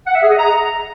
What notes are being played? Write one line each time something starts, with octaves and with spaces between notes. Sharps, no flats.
F#5
E5
G#4
D#5
A#5